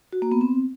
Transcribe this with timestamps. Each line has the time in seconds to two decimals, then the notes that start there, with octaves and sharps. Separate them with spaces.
0.13 F#4
0.22 A#3
0.32 B3
0.41 C4